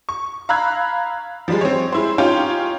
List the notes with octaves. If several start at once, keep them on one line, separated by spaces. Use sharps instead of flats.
C#6
F5 A#5 B5 E6 F#6 G#6
F3 G3 G#3
C4 C#5
G#3 E4 C5
C#4 D#4 F4 G4 C#5 G5